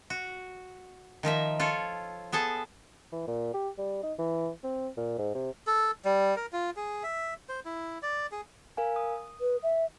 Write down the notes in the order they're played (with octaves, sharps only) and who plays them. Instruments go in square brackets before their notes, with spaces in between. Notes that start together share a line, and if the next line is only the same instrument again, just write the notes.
[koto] F#4
D#3 F3 A#4 E5
F4 A4 C#5
B3 G#4 A4 A5
[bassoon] E3
A#2
G4
G3
D#4
E3
C4
A#2
G#2
C3
[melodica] A4
G3
A#4
F4
G#4
E5
C5
E4
D5
G#4
[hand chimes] A#4 F5 G#5
D#6
[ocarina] B4
E5